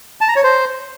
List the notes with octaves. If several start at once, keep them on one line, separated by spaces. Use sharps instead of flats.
A5
A#5
C#5
C5